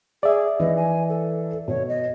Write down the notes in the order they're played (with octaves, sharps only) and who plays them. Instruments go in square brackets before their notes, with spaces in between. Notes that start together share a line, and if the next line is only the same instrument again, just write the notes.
[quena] G#4 [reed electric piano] D5 E5
[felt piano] E3 [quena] D#5
[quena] G#5
A4
[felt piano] B2 [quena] C#5
[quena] D#5